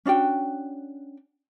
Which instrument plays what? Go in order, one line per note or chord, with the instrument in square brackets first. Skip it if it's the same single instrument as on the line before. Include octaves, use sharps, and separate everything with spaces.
[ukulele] C#4 D4 F#4 G5